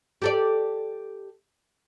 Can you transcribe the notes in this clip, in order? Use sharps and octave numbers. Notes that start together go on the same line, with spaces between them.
G4 A4 D5